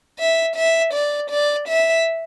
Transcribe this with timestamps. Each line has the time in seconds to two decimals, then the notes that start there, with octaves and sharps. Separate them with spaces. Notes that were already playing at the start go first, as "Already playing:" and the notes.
0.19 E5
0.56 E5
0.93 D5
1.30 D5
1.68 E5